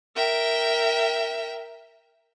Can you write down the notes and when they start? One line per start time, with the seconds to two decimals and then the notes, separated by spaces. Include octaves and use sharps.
0.16 A#4 E5 G5